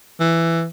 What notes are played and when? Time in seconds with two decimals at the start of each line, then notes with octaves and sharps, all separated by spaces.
0.20 E3